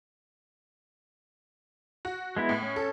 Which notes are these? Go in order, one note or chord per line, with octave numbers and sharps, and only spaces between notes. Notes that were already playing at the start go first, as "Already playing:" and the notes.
F#4
G#3 B3 E4
A2
C#4
A4